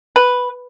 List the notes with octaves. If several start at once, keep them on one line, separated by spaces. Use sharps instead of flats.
B4